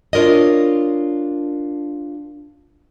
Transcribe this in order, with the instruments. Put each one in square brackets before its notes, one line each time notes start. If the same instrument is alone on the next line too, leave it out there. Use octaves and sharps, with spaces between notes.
[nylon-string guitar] D4 F4 A#4 C#5 D#5